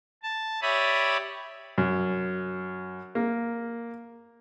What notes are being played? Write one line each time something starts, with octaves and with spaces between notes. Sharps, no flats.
A5
G4 C#5 D5 E5 B5 D#6
F#2
A#3